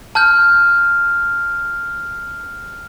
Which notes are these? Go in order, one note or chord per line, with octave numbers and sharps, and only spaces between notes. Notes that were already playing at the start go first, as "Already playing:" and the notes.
A5 F6 G6